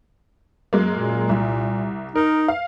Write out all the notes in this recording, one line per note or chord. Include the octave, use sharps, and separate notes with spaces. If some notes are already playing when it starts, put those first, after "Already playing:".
F#2 G#3 A#3
A#2
C2
D#4 A#4
F5